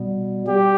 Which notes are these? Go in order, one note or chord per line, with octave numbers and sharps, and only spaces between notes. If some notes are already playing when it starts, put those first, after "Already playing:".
Already playing: B2 G3 B3
G3 G4